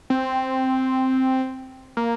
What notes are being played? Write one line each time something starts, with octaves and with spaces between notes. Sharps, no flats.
C4
A#3